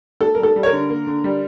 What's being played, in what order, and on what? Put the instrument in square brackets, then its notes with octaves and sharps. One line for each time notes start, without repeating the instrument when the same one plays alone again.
[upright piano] A#3 A4
G3 A#4
A4
G3
C#5
A#4
D3
A#3
D3
G3